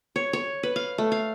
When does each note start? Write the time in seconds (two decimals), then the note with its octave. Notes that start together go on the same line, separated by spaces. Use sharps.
0.16 C#5
0.33 C#5
0.63 B4
0.76 F5
0.98 A3
1.12 F5